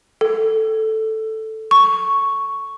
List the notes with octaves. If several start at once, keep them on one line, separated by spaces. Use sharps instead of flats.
A4
C#6